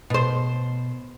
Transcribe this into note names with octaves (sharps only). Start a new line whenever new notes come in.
B2 C5